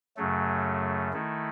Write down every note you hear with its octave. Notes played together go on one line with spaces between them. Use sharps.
F#2 C#3 F#3 A3
D#3 A3 E4